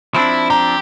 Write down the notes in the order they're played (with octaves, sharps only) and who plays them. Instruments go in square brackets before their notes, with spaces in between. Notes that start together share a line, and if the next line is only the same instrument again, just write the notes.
[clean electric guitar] F3 C4 D4 [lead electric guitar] E4
[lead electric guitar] G4 [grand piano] A#5